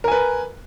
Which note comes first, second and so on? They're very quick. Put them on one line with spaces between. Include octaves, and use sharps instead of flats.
A#4 G#5 B4